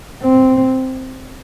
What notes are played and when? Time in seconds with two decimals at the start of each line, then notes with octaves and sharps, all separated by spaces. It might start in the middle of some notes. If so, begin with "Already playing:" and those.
0.22 C4